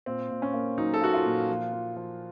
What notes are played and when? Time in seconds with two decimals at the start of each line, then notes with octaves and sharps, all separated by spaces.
0.06 A#2 C4
0.30 A#2
0.42 C#4
0.54 A#3
0.78 F#3 D#4
0.94 A4
1.01 A#3 F#4
1.13 F4
1.25 A#2
1.49 F3
1.73 F3
1.96 F3